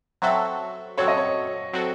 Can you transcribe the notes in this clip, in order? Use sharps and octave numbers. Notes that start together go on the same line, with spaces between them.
F#3 C4 F#4 A4 E5
F#3 C4 F#4 A4 C#5
D#5
C#5
F#3 C4 F#4 A4